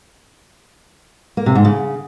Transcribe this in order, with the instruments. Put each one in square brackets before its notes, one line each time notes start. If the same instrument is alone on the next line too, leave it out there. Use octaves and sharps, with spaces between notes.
[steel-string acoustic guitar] A#3
C3
G#2
C#3